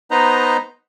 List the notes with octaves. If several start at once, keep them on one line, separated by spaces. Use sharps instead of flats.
B3 D#4 B4 C5 D#5 A#5